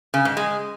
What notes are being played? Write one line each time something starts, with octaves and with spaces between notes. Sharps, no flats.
C#3
G#2
G#3